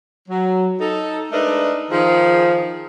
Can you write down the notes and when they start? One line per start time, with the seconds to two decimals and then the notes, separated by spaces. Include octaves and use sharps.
0.29 F#3
0.80 D#4 A4
1.32 G#3 A3 D4 D#4 A#4 B4
1.91 D#3 F3 G#4